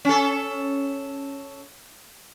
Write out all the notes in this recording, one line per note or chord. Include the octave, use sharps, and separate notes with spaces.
C#4 A4